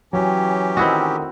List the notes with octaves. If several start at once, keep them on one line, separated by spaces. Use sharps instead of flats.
E3 F#3 C#4 G4 G5 G#5
A2 D3 D#3 C4 E4 F#4 D#6